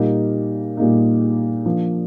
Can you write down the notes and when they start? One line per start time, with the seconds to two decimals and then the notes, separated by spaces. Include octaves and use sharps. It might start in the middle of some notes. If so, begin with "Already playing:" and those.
Already playing: A#2 G3 A#3 D#4
0.77 A#2 G3 A#3 D#4
1.66 F3 A#3 D4